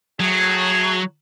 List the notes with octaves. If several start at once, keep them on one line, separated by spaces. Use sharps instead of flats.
A2 F#3 A3 G#4